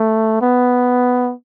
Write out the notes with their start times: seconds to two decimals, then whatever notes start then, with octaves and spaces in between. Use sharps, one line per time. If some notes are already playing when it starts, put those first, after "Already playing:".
Already playing: A3
0.41 B3